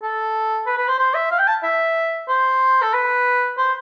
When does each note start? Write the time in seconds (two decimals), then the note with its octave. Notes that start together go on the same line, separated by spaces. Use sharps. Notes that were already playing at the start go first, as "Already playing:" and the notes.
0.03 A4
0.66 B4
0.78 B4
0.88 C5
0.99 C5
1.15 E5
1.31 F5
1.39 G5
1.47 A5
1.63 E5
2.29 C5
2.82 A4
2.93 B4
3.58 C5